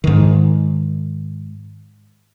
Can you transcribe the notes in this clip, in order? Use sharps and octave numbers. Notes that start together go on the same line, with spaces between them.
G#2 D#3